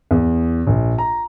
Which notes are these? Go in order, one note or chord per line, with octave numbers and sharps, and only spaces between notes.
E2
A#1
A#5